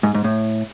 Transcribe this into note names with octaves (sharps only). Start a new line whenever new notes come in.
G#2
G#2
A2